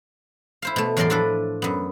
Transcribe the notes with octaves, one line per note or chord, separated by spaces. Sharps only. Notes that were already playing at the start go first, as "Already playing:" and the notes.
E4 C5 F5
B2 A3
E2 A2 F#3 A#4 D5 C6
F3 D4 E4 A4 B4
F#2 B3